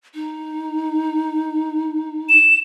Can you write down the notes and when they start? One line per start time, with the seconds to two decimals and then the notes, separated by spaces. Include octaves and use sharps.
0.14 D#4
2.29 E7